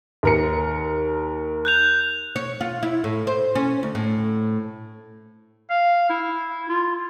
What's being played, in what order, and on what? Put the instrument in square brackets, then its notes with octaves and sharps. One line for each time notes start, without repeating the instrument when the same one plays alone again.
[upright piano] D#2 A#4 C#7
[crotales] F#6 G6 F7
[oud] C#5
F4
E4
A2
C5
C#4
D2
A2
[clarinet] F5
E4
F4